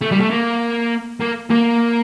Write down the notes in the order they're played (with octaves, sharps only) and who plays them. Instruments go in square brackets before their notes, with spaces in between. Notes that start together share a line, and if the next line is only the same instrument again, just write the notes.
[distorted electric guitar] A3
G3
A3
A#3
A#3
A#3